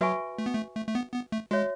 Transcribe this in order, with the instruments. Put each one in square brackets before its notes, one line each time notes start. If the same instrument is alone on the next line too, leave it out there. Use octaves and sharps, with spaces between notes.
[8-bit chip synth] F#3 [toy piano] F#4 B4 E5 G#5 C#6
[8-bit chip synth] A3
B3
A3
A3
A3
B3
B3
A3
[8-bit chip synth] G#3 [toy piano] F#4 C#5 E5